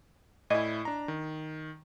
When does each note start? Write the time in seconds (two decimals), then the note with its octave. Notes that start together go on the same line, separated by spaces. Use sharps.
0.50 A2 E4 D5 D#5 G#5
0.85 D4 A#5
1.08 D#3